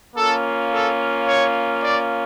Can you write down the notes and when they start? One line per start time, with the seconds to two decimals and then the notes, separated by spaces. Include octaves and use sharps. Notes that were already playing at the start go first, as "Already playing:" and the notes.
0.16 A#3 C#4 F4 A4
0.72 A4
1.27 C#5
1.81 D5